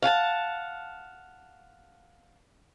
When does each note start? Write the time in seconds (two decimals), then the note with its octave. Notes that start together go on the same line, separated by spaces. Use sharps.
0.02 F5 F#5 G#5 A5